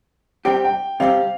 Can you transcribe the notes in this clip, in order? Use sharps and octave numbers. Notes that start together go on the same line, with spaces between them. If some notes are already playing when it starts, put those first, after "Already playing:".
C3 G3 C4 G4 G5
G5
C3 G3 C4 G4 F5